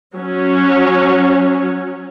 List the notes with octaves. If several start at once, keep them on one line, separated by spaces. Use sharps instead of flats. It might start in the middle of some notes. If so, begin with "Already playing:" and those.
F#3 C#4